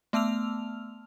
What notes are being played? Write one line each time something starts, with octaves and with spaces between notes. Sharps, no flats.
A3 B3 A5 E6 F6 F7